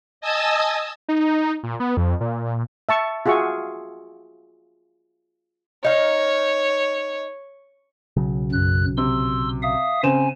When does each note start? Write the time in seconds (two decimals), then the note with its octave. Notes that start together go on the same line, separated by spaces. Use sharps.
0.21 D#5 G#5 A5 D#6 E6
1.09 D#4
1.64 A#2
1.80 B3
1.97 F2
2.21 A#2
2.89 E5 A5 C#6
3.26 F4 F#4 G#4 E5 C#6
5.85 D#4 C#5 F5
8.17 B1 C#3 F#3
8.52 F#2 F#6
8.97 C3 C6 E6
9.62 E5 F5 D#6
10.03 C#3 C4 G#5 E7